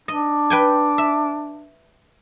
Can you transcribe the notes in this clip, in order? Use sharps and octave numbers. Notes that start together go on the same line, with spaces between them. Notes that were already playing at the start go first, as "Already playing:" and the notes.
D4 D#5
B4 G5 G#5
E5